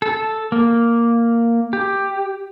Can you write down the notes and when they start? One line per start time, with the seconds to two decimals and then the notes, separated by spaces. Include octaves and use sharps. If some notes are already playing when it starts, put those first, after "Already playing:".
0.02 A4
0.52 A#3
1.73 G4